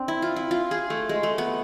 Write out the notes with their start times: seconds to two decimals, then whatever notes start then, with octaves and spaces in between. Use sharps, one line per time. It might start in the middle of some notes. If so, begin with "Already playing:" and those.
Already playing: C4 D4
0.08 E4
0.22 F4
0.36 E4
0.51 F4
0.71 G#4
0.90 A3
1.09 G#3
1.23 A3
1.38 B3